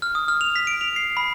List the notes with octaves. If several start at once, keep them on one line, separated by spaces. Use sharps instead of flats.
F6
D#6
F6
F7
B6
D7
F7
C7
B5